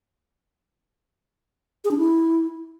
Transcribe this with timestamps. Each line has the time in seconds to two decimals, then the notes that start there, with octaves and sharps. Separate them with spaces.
1.84 G#4
1.91 D4
1.98 E4